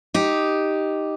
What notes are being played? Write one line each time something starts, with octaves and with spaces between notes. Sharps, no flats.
D#4 G4